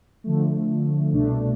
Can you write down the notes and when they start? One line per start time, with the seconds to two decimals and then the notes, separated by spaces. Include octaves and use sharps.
0.24 D3 F3 A3
1.12 C2 B2 A3 D4